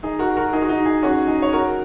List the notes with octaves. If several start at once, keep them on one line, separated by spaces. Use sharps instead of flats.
D#4 G#4
F#4 A#4
F#4 A#4
D#4 G#4
F#4
D#4
D#4 G#4
C#4 F#4
D#4 G#4
C#5
F#4 A#4